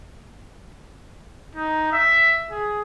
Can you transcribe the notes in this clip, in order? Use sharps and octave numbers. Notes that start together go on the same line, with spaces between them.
D#4
E5
G#4